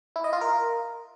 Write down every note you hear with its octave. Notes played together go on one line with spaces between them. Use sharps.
E4
D#5
F4
A#4